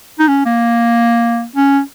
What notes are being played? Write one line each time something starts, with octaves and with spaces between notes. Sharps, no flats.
D#4
C#4
A#3
C#4